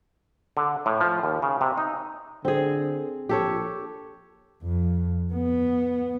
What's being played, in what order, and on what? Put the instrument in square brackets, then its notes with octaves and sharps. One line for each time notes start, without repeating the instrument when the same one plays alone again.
[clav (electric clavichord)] D3
A2
F3
D#2
C#3
C3
D#4
[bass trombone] D3 [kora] C4 G#4
[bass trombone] A#1 [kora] G4 A4 C#5
[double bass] F2
B3